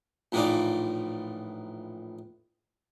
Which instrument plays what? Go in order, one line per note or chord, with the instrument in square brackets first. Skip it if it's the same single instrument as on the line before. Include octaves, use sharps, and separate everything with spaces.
[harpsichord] A#1 A2 E3 D#4 F4 D5